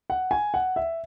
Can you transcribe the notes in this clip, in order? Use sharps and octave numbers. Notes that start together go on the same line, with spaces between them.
F#5
G#5
F#5
E5